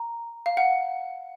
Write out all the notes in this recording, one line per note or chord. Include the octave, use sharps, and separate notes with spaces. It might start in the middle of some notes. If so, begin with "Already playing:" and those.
Already playing: A#5
F5
F#5